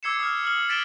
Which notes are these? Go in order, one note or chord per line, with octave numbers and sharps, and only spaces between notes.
D6 E6 G#6 C7 C#7 E7
D#6 F6
D#6 F6 F#7
A6 B6 D7 E7 F#7 G7